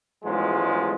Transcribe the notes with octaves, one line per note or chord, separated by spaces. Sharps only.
A1 E2 G#2 F3 F#3 G#3